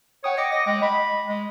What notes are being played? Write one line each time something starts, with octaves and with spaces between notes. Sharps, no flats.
C#5 F#5 G5 D#6
D#5 D6 A#6 C#7
D#5 A#6
G#3 G5
D#5 B5
G#3